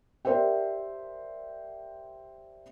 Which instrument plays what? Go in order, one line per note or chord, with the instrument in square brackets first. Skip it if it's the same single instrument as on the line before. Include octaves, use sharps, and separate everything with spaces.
[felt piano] G4 A#4 C5 D5 E5 G5